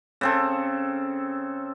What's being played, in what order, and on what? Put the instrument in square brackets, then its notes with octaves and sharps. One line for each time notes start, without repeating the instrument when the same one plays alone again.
[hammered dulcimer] C#3 C4 A4